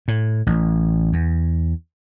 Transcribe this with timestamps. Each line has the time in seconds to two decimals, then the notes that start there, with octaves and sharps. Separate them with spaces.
0.08 A2
0.47 A1
1.13 E2